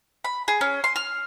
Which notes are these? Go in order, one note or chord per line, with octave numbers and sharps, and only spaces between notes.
B5
G#4
C#4
C6
F6